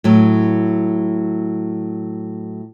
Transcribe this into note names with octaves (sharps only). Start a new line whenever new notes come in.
A2 F#3